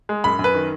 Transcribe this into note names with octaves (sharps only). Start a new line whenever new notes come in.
G#3
F#2 B5
F#2
B4
D#3